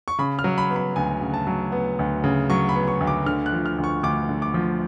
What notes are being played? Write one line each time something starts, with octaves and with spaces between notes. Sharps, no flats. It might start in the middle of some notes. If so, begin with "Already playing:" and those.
C#6
C#3 B5
F6
F#3
B5
B3
B5
D2 G#5
C#3
A5
F#3
B3
D2
C#3
F#3 C#6
B5
B3
C#6
D2
D6
D3 F6
F#6
F3
F6
D2
C#6
D2 D6
D3
D6
F3